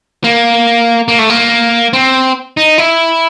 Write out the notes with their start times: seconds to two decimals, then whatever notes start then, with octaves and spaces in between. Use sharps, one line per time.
0.24 A#3
1.08 A#3
1.19 A3
1.30 A#3
1.93 C4
2.57 D#4
2.78 E4